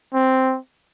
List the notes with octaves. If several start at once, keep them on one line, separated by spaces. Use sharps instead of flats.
C4